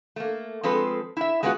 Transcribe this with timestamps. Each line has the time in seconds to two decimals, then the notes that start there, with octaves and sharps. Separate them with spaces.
0.16 A3 A#3
0.63 F3 G#3 C4 A4 B4
1.17 E4 E5
1.43 G#3 A3 B3 F4 F#4 G#4